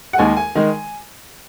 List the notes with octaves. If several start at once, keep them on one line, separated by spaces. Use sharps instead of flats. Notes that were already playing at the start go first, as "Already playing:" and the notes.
F#5
D#2 D#3 G#3 G#5
G#5
D#3 G#3